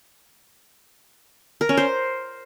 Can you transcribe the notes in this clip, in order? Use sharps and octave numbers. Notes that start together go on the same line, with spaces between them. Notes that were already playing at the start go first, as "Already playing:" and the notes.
A#4
C#4
C5